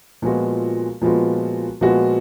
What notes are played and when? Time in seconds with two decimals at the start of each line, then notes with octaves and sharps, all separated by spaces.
0.22 A#2 F3 G#3 B3 F#4
1.01 A#2 F3 G#3 B3 F#4
1.81 A#2 F3 G#3 B3 F#4